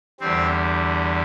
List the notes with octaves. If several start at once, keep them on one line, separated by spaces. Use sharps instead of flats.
E2 D3 G3 C4 C5